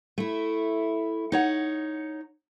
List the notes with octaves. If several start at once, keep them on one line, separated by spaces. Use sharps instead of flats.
A3 E4
D#4 C#5 F#5